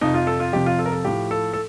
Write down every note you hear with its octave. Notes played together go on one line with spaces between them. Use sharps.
F2 C3 F3 D#4
F4
A4
F4
F2 C3 F3 G4
F4
A4
A#4
A4
A2 F3 G4
A4
A4